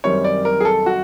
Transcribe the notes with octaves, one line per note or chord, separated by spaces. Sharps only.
F#2 D#3 G3 C4 C#5
D5
A#4
G#4
A4
F#4